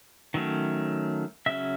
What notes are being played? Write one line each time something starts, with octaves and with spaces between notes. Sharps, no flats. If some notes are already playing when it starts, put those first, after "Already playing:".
D#3 F#3 A3 C#4
C#3 F#3 C#4 E5